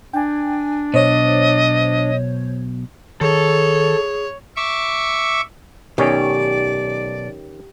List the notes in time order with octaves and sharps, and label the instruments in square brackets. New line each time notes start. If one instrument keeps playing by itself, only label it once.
[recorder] D4 [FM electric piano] G5 G#5
[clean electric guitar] B1 B2 [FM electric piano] C5 C#5 [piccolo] D#5
[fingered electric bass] D#3 [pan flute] G#4 [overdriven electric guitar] A4 [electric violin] C#5
[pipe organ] E5 C#6 D6
[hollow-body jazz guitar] B1 [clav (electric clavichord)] D#3 C#4 C#5 [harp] G4 [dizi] D5